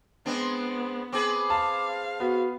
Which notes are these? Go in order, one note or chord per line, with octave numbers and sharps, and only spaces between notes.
G#3 B3 C4 D4
C4 G#4 B4 D6
F5 A5
B3 F#4